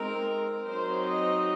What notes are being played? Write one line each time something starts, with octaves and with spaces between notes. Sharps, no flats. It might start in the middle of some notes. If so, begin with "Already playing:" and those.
Already playing: G#3 C4 D#4 A#4
F#3 C4 D#4 C5
D#5